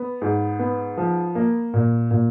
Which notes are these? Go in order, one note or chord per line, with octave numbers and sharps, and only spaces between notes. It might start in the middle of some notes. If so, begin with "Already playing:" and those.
Already playing: B3
G#2
B3
F3
A#3
A#2
A#2